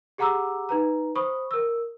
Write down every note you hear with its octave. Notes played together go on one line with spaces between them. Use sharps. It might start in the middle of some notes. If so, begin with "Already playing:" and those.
G4 G#4 F#5 A#5 D6 E6
D#4 B4 A#5
C5 B5 C#6 D#6
A#4 E6